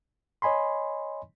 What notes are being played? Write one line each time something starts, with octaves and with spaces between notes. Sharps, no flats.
C#5 D#5 G#5 B5 C6